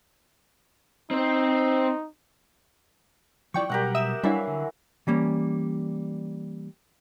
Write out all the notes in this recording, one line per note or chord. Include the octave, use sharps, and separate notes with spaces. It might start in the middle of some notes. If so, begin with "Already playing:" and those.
C4 D#4 C5
F3 G3 E4 D5 G5 C#6
B2 F#3 G3 G4 A#4 F#5
E5 D#6 E7
E3 F#3 G3 D4 E4 E5 F5
D3
E3 G3 A#3 C#4